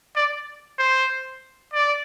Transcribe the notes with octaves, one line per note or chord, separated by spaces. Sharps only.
D5
C5
D5